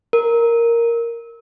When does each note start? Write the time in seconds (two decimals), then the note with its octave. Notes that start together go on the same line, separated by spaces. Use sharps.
0.13 A#4